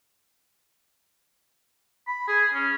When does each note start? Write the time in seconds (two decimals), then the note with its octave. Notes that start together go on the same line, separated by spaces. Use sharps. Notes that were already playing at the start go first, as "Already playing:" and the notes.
2.07 B5
2.28 G#4
2.54 C#4